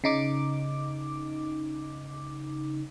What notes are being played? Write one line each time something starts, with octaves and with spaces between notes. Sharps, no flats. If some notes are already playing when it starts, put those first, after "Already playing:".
C#3 D#4 D6